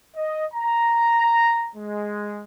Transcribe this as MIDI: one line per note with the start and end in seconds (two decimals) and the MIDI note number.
0.16 0.44 75
0.52 1.69 82
1.75 2.43 56